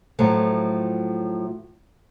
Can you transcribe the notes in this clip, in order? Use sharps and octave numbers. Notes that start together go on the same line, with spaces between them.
A2 F3 F#3 A3